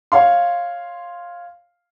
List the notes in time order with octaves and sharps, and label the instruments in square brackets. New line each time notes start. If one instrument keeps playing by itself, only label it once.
[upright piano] C#5 F5 C6